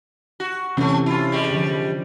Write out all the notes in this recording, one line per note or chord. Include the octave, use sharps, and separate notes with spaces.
F#4
F#2 C3 E3 A3 C#4
E4 F4
G3 G#3
D3 F3